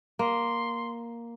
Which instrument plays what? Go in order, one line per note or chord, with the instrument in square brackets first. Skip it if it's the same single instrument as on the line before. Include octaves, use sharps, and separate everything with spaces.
[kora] A#3 [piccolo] C6